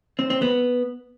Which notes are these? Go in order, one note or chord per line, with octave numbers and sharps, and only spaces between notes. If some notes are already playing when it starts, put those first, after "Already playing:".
C4
C4
B3